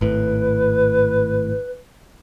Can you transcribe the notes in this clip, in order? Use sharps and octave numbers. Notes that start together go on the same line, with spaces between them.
G#1 A2 B4